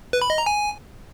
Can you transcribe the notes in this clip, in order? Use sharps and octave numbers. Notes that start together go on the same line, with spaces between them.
B4
B5
D#5
A#5
G#5